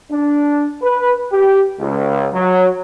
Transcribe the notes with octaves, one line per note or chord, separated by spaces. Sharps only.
D4
B4
G4
C#2
F#3